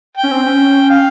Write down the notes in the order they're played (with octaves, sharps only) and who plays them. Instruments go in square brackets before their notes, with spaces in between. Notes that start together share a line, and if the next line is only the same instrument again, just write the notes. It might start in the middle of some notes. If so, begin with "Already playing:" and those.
[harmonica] G5
[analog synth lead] C#4
C4
C#4
[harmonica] F5